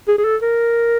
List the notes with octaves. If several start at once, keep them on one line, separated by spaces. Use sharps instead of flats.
G#4
G#4
A4
A#4